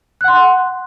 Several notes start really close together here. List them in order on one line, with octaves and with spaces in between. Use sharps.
F#6 F#5 C6